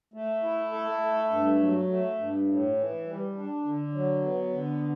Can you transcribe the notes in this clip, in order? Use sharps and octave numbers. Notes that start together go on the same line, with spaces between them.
A3
E4
A4
A3
G2
F#3
A3
G2
A2
E3
G3
D4
D3
F#3
B3
D3